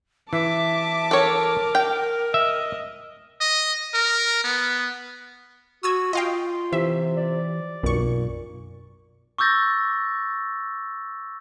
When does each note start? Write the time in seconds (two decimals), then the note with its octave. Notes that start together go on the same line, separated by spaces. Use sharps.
0.33 E3 E5 A5 D6
1.11 A4 A#4 C#5
1.75 G5
2.34 D#5 E5
3.41 D#5
3.94 A#4
4.44 B3
5.83 F#4 D#6 E6 G#6
6.13 F4 D#5 F5 G5
6.73 C3 E3 E5
7.17 D5
7.83 B1 F#2 A#2 C#6
9.38 C#6 D6 E6 G6 A6 A#6